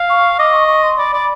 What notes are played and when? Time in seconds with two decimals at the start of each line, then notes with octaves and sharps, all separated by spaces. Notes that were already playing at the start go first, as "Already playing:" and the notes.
Already playing: F5
0.10 C#6
0.39 D#5 D6
0.53 C#6
0.68 C#6
0.83 C6
0.98 D5 B5
1.13 D5